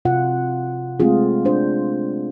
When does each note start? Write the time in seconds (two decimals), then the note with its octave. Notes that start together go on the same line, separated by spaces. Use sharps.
0.05 C3 F4 F#5
1.00 G#3 A3 C4 F4 G#4
1.45 D4 C5